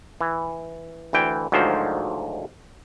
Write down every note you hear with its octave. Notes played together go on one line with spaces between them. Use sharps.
E3
D2 E3 G5
D2 G#2 D#3 F3 F#3 C5